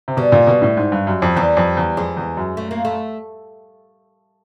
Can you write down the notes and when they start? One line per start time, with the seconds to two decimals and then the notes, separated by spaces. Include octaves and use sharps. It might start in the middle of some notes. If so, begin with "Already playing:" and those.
0.08 C3
0.17 B2 G3
0.32 A#2
0.47 B2
0.62 A2
0.77 G#2
0.92 G2
1.07 F#2
1.22 F2
1.36 E2 G3
1.57 F2
1.77 E2
1.97 F2 G#3
2.17 E2
2.37 F#2
2.57 A3
2.71 A#3
2.85 A3